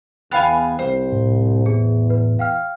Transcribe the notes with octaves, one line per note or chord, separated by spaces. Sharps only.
E2 B3 F5 G5 G#5 B5 F#6
C2 C5
A2
E2 G#4
B4
F5 G5 F6